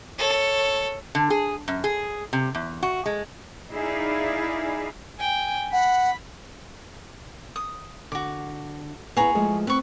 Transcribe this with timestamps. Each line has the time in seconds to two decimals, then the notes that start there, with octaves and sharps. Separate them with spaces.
0.18 A4 C#5
1.15 D3
1.30 G#4
1.68 F#2
1.84 G#4
2.33 C3
2.55 E2
2.83 F#4
3.06 G#3
3.72 D#4 E4 G#4 D5 F5
5.18 G5 G#5
5.72 F#5 B5
7.56 D#6
8.12 D3 F#4 D6
9.17 B3 E4 G#4 C#5 A#5
9.35 F3 G#3 A3
9.67 C4 B4 C#6